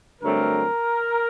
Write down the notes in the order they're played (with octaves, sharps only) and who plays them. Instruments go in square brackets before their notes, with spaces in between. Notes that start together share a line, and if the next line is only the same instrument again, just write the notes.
[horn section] G2 D3 F#3 A3 C4 A#4